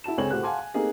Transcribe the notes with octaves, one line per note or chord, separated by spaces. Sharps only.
E4 F#4 A5 E7
C#2 D3 C4 C#5 G#5 F#7
A2 F#4 G4 C5 F#6
F5 F#5 G#5 A5 C6 D6
G#5
A3 A#3 C4 D#4 G4 G#4